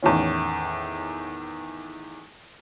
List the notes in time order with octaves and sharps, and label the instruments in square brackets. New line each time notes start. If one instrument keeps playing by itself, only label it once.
[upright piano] E2 A2 D#3 C#4